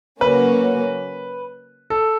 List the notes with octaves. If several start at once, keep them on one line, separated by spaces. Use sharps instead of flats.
C#3 F#3 A#3 C#4 F#4 B4
A4